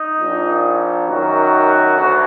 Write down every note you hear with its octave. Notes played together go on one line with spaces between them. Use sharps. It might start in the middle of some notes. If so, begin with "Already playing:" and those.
Already playing: D#4
A#1 A#2
F#2 D#3 F#4
D2